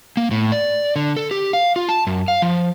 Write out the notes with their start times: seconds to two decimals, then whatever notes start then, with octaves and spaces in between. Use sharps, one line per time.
0.17 A#3
0.31 A2
0.52 D5
0.96 D3
1.17 A4
1.31 G4
1.53 F5
1.76 F4
1.89 A5
2.07 F#2
2.28 F5
2.42 F3